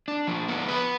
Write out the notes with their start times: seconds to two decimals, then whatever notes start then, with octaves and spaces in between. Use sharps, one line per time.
0.08 D4
0.27 F3
0.48 B3
0.68 B4